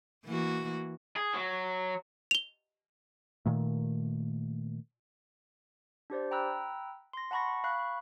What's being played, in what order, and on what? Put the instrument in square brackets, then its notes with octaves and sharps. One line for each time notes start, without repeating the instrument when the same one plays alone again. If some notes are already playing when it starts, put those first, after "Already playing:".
[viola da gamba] E3 A#3 F#4
[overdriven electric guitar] G#4
F#3
[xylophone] F7 G7
[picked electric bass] A#2 D#3 A3
[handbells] D4 G4 C5 D5
G5 A#5 B5 E6 F#6
C6 A#6
F#5 A5 B5 C#6 A#6
F5 B5 C#6 F#6